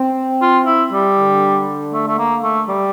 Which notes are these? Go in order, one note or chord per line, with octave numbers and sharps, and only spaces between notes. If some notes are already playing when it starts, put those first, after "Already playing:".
Already playing: C4
F4
E4
G3
D3
A3
A3
A#3
A3
G3